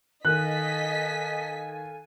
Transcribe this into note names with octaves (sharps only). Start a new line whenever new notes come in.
D#3 A4 D#5 F5 G#5 F#6 B6